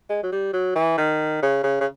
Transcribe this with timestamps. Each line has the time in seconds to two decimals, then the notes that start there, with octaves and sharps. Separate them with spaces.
0.10 G#3
0.23 F#3
0.32 G3
0.53 F#3
0.75 E3
0.98 D#3
1.42 C#3
1.64 C#3
1.81 C#3